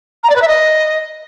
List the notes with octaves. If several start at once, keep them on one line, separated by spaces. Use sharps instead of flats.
A#5
D5
B4
E5
D#5